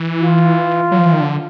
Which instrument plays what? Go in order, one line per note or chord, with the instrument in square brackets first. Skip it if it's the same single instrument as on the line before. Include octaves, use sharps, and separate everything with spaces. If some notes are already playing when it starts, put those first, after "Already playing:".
Already playing: [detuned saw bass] E3
[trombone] F4
[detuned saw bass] F#3
F3
E3
D#3
D3